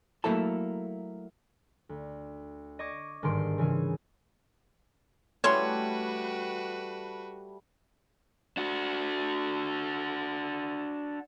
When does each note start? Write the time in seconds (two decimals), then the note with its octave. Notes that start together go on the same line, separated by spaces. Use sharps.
0.24 F#3 A3 A#3 E4 A4 A5
1.89 D2
2.79 D#5 C#6 D6 G#6
3.23 G1 G#2 D#3 C6 D7
3.58 C#3 E3 G#4
5.44 E3 G3 A3 C#4 F#4 B4 C#5 C6
8.57 D4 F#4